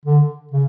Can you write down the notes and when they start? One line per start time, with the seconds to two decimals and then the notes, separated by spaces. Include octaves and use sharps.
0.05 D3
0.51 C#3